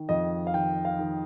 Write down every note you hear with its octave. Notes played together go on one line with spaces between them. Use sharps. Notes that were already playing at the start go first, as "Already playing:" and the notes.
Already playing: D#3
F2 D#5
F5
D#3 G5
F5
D#3